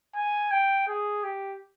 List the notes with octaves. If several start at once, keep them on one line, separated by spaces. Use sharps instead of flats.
G#5
G5
G#4
G4